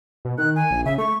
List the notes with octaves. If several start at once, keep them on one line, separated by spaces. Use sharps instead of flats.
B2
D#3 F#6
G#5
A#1
C#3 E5
A3 C#6